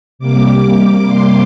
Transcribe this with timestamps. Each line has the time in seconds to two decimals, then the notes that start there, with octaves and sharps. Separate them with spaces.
0.19 C3 G3 A#3 D6
1.07 C6